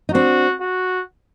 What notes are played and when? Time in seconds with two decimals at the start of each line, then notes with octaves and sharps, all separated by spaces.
0.09 D#4
0.14 C4 D4 F#4
0.61 F#4